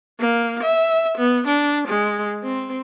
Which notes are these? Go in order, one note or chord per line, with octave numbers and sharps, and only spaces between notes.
A#3
E5
B3
D4
G#3
C4